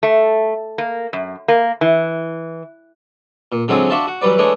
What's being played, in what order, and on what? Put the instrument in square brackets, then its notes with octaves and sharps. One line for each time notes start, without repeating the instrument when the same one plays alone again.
[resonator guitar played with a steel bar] A3
A#3
F#2
A#3
E3
[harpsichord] A#2
D3 F#3 G#3 C4 F4 G#4
D4 F#4 E5 F5 A5 C6
F#4
E3 F#3 G3 B4 D5
E3 G#3 A3 D4 G#4 C#5